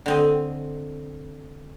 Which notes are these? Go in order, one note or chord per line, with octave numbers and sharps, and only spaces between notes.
D3 C4 D#5